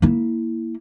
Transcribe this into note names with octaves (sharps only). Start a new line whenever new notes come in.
A#3 E4